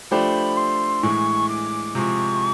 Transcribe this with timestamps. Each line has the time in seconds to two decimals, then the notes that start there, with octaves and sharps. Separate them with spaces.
0.11 F3 A3 D4 G4 C5 B5
0.57 C6
1.03 A2 E3 G#3 C#6
1.48 D6
1.95 C3 F3 G#3 C#6 D6